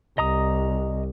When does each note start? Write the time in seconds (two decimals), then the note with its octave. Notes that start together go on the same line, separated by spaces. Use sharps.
0.18 C2 D#5 A#5 D#6